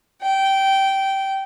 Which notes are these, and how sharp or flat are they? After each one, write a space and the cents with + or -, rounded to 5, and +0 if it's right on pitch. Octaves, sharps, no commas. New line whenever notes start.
G5 -15